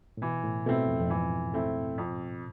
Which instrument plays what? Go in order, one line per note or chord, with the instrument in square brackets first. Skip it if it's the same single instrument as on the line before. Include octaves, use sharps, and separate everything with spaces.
[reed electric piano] A2
[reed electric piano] B2 [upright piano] E3
[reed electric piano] A2
[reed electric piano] B2 [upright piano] A3 C4 E4
[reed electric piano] F2
F2
[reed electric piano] G#2 [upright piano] E3
[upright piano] A3 C4 E4
F2